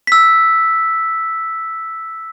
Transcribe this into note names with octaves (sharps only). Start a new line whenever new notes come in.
E6 B6